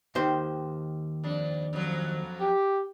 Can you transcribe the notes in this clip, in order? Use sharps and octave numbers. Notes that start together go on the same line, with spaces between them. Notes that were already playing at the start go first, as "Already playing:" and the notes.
D#2 D#3 C5
F2 D4
F2 F3 F#3
G4